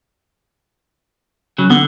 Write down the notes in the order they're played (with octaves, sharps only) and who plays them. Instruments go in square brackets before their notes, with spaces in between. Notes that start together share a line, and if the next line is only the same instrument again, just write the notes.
[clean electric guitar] C#3 F#3
[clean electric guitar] D3 [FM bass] B3